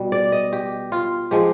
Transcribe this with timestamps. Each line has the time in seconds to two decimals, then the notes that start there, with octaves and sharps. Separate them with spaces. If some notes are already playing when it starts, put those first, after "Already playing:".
Already playing: B2 G3
0.12 D5
0.32 D#5
0.52 G4
0.92 F4
1.31 F3 G#3 G4